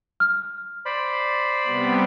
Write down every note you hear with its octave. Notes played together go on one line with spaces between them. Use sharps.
F6
C5 D5 B5
C3 G3 B3